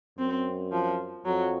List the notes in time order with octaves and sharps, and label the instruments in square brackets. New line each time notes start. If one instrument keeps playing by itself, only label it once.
[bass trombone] F#2 [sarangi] C4
[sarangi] F3
[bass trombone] F2 [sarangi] F#3